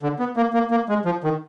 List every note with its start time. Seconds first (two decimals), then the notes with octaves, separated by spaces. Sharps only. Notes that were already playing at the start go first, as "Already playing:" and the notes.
0.03 D3
0.19 B3
0.37 A#3
0.54 A#3
0.71 A#3
0.89 G#3
1.05 F3
1.24 D#3